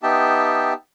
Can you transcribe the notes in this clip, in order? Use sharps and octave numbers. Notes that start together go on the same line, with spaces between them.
B3 D#4 G4 E5 G5 A5